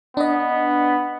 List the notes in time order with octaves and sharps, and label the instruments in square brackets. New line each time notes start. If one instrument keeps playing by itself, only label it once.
[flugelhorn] B3 [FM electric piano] D4 D#5